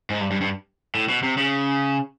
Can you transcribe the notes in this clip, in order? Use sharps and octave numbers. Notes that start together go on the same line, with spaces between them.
G#2
G2
G2
G2
A2
B2
C3
C#3